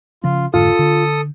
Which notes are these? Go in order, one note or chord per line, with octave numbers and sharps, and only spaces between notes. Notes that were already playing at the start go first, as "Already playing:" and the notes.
C#3 F3 C#4 F4
F1 G#2 D3 F4 A4 D#6
D3